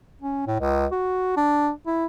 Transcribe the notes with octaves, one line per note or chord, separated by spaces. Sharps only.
C#4
A2
C#2
F#4
D4
E4